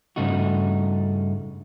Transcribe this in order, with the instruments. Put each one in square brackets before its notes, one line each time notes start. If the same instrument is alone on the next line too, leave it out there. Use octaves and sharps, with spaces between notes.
[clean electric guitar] G2 C#3 A3 D#4 F#4